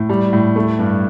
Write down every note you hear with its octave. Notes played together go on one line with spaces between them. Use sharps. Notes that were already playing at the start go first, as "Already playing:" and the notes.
Already playing: A2
G3
A2
A3
G2